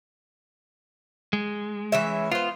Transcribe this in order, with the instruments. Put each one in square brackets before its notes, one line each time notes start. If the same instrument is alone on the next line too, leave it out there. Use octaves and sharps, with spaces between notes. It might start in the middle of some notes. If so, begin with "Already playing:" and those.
[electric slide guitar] G#3
[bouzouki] E3 C#4 E5
[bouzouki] B3 C5 [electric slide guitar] F4